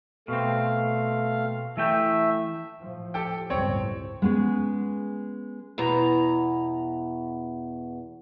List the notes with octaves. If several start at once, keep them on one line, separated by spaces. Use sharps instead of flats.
B2 A3 C4 F5
E3 A3 E5 G5
A2 F3
G4 A4 G5
G1 C#2 A2 C4 C#5
G#3 B3 C#4 G#4
E2 B2 A#5